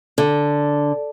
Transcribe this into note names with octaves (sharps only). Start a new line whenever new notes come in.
D3